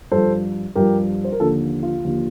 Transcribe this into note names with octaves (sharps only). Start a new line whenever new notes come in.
G2 F3 A4 C5
G2 F3 G4 A#4
C5
A#4
D#2 D3 F3 F4 A4
F4
D#2 D3 F3